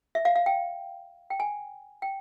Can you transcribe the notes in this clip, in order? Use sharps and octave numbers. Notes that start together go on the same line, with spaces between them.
E5
F5
F5
G5
G5
G#5
G5